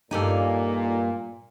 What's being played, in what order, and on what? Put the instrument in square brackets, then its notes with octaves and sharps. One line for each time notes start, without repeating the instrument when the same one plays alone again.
[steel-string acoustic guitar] G2 A#3 G#5 [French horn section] A#2 [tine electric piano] D#4 G4 A4